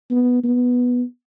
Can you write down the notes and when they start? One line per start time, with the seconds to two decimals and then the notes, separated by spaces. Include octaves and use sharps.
0.10 B3
0.43 B3